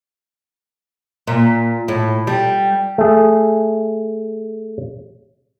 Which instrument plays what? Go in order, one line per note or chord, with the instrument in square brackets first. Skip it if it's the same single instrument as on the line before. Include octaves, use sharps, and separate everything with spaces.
[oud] A#2
A2
G3
[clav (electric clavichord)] A3 G#4